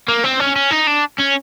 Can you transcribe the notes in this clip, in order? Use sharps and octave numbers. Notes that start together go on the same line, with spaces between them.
A#3
C4
C#4
C#4
D#4
D4
C#4